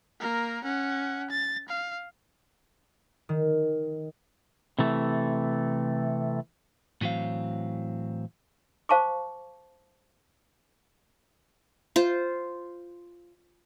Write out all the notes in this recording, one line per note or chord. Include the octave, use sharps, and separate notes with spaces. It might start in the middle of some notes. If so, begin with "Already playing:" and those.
A#3 A#4
C#4 F#5
A6
F5
D#3
C3 E3 A3
A2 E3 F#3 C4 F5
C5 F5 A5 C#6 D6
F4 C5